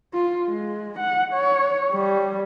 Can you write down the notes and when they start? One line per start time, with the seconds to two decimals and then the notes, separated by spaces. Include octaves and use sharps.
0.13 F4
0.48 G#3
0.99 F#5
1.34 C#5
1.93 G3